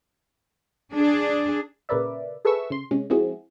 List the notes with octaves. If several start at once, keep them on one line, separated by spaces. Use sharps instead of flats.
D4 G#4
A#2 C#3 A#4 B4 D5 E5
G#4 A4 B4 E5 C#6 E6
C#3 C6
C3 G#3 C#4
F3 G#3 C4 E4 F#4 G#4